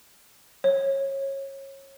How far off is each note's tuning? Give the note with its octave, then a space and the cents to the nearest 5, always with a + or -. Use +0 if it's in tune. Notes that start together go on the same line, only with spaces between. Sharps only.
C#5 -25